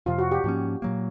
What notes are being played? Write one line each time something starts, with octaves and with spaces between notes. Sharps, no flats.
F2 C3 F3 F4
F#4
G4
G#2 F3 A#3 C#4
A#2 F#3 A#3